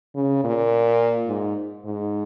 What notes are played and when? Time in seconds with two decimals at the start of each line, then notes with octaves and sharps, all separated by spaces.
0.15 C#3
0.44 A#2
1.28 G#2
1.85 G#2